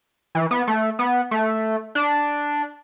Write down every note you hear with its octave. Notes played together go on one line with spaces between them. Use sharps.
E3
B3
A3
B3
A3
D4